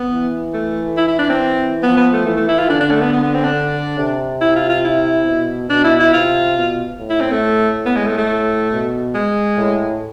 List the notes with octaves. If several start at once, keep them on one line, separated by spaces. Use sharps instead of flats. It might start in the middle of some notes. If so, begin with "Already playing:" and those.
Already playing: B3
E3
A3
E4
E4
D4
C4
F3 B3
B3
A3
E3 A3
A3
E4
F4
D3 D4
D4
A3
B3
B3
B3
C4
D4
C3
E4
F4
F4
E4
B2
B2 D4
E4
E4
C3 F4
B2
A2
E4
C4
A3
B3
G#3
A3
A3
A2
B2
G#3
A2